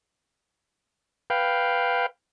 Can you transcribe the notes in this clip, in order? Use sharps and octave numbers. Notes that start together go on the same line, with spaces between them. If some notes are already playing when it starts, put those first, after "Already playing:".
B4 F5 G5